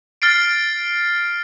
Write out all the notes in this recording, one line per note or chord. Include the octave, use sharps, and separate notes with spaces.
F6 A6 C7 D7